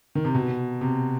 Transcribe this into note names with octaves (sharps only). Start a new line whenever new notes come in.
D#3
C3
B2
C3